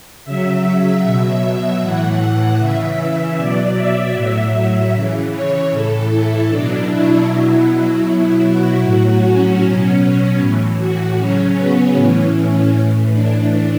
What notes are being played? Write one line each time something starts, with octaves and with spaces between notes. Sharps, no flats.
C#3 F#3 E5
B2 F#3
A2 E3 F#5
C#3 E3 E5
B2 F#3 D5
E5
A2 F#3
C#3 E3
C#5
A2 E3 A4
E4
B2 F#3 D4
E4
B2 F#3
E4
B2 F#3
F#4
A2 F#3
C#4
B2 F#3
A2 E3
F#4
C#3 F#3 C#4
B3
A2 E3 C#4
A2 E3
D4